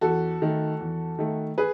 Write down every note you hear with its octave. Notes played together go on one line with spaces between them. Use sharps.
E2 F#4 A4
D#3 A3
E2
D#3 A3
G#4 B4